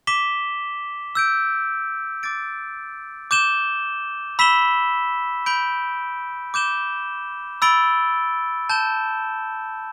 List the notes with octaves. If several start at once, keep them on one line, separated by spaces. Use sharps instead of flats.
D6 B6 E7 G7
E6 G6 D7
D6 A6 D7
D6 G6 E7 G7
B5 E6 B6 E7 G7
B5 G6 D7 G7
D6 G6 E7 G7
B5 E6 A6 D7 G7
A5 G6 E7 G7